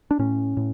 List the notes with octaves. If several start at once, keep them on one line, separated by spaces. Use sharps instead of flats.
D4
A2 C#4
A2